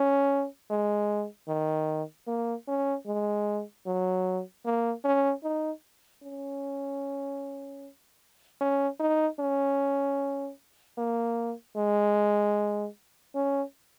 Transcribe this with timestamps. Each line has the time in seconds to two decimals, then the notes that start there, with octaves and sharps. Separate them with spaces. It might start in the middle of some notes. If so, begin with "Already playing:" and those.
Already playing: C#4
0.70 G#3
1.48 D#3
2.27 A#3
2.68 C#4
3.06 G#3
3.86 F#3
4.65 A#3
5.05 C#4
5.43 D#4
6.23 C#4
8.61 C#4
9.00 D#4
9.40 C#4
10.98 A#3
11.76 G#3
13.35 C#4